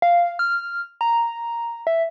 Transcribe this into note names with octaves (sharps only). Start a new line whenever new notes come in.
F5
F6
A#5
E5